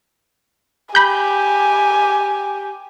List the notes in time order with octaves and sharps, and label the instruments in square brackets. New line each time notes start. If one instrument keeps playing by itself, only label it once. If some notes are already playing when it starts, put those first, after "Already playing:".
[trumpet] G4 [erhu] G#5 [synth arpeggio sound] B5 G6